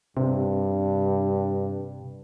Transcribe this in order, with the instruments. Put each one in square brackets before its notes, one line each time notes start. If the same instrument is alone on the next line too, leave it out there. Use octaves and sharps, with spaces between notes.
[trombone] G2 [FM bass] C3